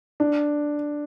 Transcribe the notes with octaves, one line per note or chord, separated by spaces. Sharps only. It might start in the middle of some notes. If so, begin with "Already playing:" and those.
D4